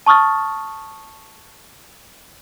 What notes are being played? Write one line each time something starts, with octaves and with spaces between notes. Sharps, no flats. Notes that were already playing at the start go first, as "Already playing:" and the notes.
A5 C#6 D#6 F6 A6